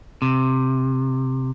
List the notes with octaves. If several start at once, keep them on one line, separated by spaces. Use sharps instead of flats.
C3